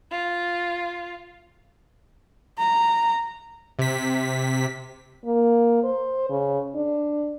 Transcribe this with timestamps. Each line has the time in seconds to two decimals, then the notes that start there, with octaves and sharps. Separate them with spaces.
0.11 F4
2.59 A#5
3.79 C3 B6
5.25 A#3
5.84 C5
6.30 C#3
6.75 D4